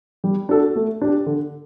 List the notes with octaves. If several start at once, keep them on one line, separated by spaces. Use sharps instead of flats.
G3
D4 F#4 A4
A3
D4 G4
D3